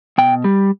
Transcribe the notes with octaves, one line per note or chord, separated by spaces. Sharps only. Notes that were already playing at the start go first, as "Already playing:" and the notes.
B2 G5
G3